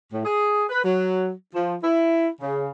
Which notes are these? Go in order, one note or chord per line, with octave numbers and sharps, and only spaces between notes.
A2
G#4
B4
F#3
F3
E4
C#3